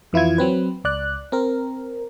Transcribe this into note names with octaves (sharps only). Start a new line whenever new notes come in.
F2 E3 E4 F4 G#6
F#3 C4 B4
C#2 D5 F#6
C4 A#4